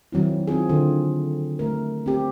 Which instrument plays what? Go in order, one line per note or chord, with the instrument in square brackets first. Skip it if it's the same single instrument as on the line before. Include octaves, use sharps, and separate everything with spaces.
[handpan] D#3 F#3 C4 E4
C4 D#4 F4 G#4
D3 F4
A3 A#4
C4 G4